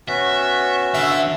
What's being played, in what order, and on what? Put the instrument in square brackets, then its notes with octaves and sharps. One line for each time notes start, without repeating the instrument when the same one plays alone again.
[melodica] B3 C#4 F#4 [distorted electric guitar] E5
[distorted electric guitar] D3 [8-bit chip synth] E5